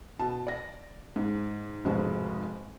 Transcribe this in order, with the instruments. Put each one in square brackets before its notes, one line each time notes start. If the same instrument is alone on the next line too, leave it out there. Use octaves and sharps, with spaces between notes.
[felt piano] B2 A5
D5 A#6
G#2
F1 F2 G#2 B2 G#3 F#4